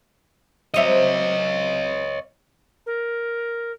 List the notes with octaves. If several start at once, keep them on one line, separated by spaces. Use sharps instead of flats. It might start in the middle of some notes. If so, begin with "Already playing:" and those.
F#3 C4 C#5 D#5 E5
A#4